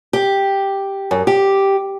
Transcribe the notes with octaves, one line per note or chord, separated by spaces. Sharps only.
G4
F#2
G4